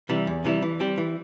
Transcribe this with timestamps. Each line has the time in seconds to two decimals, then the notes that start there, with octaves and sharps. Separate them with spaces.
0.09 C3 E3 G3 E4
0.27 E2
0.44 C3 E3 G3 E4
0.62 E3
0.80 G3 C4 G4
0.98 E3